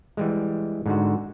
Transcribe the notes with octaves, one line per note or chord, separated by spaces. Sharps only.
E3 G3 G#3
G#2 D3 F#4